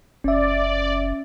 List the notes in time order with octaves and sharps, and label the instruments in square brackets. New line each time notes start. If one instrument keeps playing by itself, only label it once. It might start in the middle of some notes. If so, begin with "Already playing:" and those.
[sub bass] F#1 [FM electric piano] C#4 E5 [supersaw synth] D5